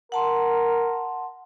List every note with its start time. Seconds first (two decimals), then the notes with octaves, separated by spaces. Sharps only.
0.12 A#4 F#5 A5 C6